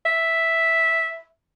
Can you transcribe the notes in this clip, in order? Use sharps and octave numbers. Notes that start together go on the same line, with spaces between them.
E5